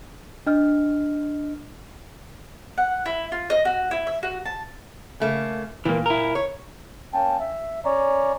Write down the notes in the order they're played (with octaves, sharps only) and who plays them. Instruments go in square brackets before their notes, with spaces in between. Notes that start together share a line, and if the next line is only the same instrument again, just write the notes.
[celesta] D4 D#5 F6
[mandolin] F#5
E4
F4
D#5
F#4
E4
E5
F#4
A5
[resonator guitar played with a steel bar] C#3 A3 A#3
[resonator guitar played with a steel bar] A#2 [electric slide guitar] E3 A#3
[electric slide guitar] E4 A#4
[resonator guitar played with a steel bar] C#5
[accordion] A#3 C#4 G5 A5
E5
C#4 C#5 D5 A#5